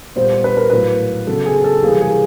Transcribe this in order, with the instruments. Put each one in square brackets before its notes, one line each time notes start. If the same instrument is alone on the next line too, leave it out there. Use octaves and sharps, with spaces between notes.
[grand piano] A#2 G3 B3 C5
B4
A#4
A2 F#3 A#3 B4
C#3 F#3 B3 A4
G#4
A4
C3 E3 G3 A#3 G#4
G#4